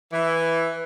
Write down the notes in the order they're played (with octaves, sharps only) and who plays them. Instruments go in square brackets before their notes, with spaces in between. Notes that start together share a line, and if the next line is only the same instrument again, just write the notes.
[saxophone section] E3